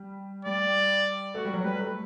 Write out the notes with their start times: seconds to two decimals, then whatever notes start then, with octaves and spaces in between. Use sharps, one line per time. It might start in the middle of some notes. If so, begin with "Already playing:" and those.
Already playing: G3
0.45 G3 D5
1.35 A3 F#4
1.45 G3
1.54 F#3
1.64 G3 B4
1.80 A3